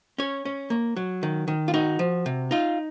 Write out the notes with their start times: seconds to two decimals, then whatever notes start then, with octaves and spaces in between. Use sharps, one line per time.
0.18 C#4 C#5
0.45 C#4
0.70 A#3
0.96 F#3
1.23 D#3
1.48 D#3
1.68 F4
1.74 D#4 F#4
1.99 F3
2.26 C3
2.51 D#4 F4